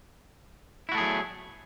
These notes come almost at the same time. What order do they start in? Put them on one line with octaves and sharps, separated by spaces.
E4 F#4 A3 G#4 F#3